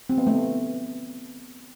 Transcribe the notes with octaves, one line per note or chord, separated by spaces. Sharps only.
C4
B3
A3
B3